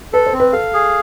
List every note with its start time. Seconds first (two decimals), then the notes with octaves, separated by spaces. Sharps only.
0.13 A4 B4
0.27 C5
0.33 C4
0.40 B4
0.53 A4 F5
0.74 G#4